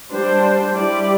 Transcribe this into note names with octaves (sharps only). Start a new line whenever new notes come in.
G3 D4 C5
G3 E4 G4 D5